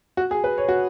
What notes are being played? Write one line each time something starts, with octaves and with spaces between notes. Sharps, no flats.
F#4
G#4
B4
C#5
F#4